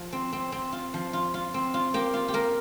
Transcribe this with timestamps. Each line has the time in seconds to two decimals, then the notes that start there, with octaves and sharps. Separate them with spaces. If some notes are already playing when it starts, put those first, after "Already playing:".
Already playing: F3
0.12 C4
0.33 C4
0.52 C4
0.73 F4
0.94 F3
1.13 F4
1.34 F4
1.54 C4
1.74 F4
1.94 A#3 G4
2.14 F4
2.28 G4
2.34 A#3 A#4